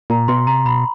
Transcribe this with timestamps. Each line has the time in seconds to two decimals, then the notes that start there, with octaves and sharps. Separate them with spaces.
0.10 A#2 A#5
0.28 B2 C6
0.47 C3 A#5
0.65 B2 B5